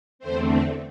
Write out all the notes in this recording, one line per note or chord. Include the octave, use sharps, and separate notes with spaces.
E2 D3 A3 C4 C5